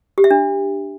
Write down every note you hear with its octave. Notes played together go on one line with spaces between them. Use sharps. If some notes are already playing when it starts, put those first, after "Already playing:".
G4
E5
D4